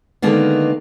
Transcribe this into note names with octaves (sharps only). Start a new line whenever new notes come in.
D3 D#3 G#3 A#3 B3